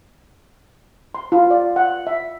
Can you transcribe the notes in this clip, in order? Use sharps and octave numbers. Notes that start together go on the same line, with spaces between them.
C6
F4
D5
F#5
E5